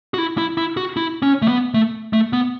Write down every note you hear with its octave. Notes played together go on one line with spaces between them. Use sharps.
F#4
E4
E4
E4
F#4
E4
C#4
A3
B3
A3
A3
B3